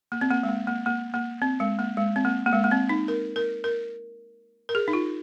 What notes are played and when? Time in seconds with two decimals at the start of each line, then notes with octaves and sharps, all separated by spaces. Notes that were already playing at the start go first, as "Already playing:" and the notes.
0.12 A#3
0.21 C4
0.31 A#3
0.43 G#3
0.49 A#3
0.67 A#3
0.86 A#3
1.14 A#3
1.42 C4
1.60 G#3
1.79 A#3
1.97 G#3
2.16 C4
2.25 A#3
2.46 A#3
2.53 G#3
2.64 A#3
2.71 C4
2.89 D#4
3.08 A#4
3.36 A#4
3.64 A#4
4.69 A#4
4.75 G#4
4.88 D#4
4.93 F4